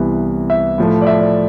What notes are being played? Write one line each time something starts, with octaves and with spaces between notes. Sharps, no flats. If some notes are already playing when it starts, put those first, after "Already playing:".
Already playing: C2 C3 E3 B3
E5
A2 F3 A3
D5
E5
D5